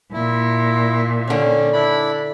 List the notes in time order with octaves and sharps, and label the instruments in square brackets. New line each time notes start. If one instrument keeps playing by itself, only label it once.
[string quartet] A#2 [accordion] E4
[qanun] D3 C#5 [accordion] D#3 C#4
[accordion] D4 E4 B5